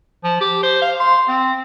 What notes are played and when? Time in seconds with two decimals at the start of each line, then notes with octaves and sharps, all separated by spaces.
0.24 F3
0.41 G4
0.63 C5
0.82 F5
1.00 C6
1.28 C4